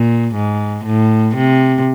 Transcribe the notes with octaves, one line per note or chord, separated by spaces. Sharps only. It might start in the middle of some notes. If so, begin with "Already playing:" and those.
Already playing: A#2
G#2
A2
C3